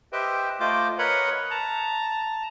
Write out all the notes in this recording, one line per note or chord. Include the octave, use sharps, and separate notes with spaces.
G4 B4 C5 D#5 E5 G5
A3 F4 C5 D#5 D6
A#4 B4 C#5 D#5 F#5 B5
A5 A#5